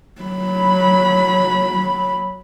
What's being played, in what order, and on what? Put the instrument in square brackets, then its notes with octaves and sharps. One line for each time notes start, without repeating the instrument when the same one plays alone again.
[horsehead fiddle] F#3 B5